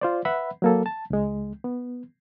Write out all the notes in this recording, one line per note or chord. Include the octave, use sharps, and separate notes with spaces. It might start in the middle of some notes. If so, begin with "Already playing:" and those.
F4 C5 D5
B4 E5 F#5 B5
F#3 A#3 A4
A5
C#2 G#3
B3